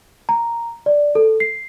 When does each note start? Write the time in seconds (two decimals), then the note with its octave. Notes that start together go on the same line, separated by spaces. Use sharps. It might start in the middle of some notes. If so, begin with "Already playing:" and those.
0.29 A#5
0.86 D5
1.15 A4
1.40 C7